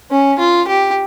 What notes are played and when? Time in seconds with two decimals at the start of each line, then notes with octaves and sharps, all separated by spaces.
0.11 C#4
0.39 F4
0.67 G4